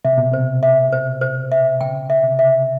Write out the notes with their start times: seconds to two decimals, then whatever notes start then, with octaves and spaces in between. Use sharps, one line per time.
0.05 C3 E5
0.18 B2
0.31 C3 C5
0.63 E5
0.92 C5
1.21 C5
1.52 E5
1.81 C#3 G5
2.10 E5
2.24 C3
2.39 E5